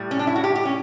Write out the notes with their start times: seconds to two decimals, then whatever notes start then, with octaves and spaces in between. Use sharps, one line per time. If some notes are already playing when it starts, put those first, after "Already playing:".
Already playing: A2 G3
0.11 C#4
0.19 D4
0.27 E4
0.36 F#4
0.44 G4
0.56 G4
0.65 C#4